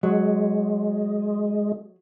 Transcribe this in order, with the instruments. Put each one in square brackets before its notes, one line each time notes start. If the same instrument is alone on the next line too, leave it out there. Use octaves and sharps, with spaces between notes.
[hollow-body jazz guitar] F#3 [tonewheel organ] G#3